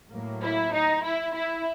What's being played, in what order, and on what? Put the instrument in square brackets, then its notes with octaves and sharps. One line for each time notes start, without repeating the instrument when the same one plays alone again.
[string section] A2 F#3 A#3
E4
D#4
E4
E4